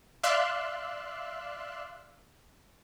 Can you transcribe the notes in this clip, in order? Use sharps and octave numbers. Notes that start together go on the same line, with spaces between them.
D5 E5 F5 C6 E6 F#6